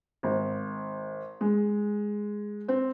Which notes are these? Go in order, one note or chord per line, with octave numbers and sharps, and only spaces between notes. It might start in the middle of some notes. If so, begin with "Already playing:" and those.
G#1
G#3
C4